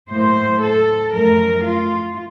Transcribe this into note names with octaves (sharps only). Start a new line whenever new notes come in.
A2 F#3 A#3 C5
A4
F#2 F3 A3 A#4
F4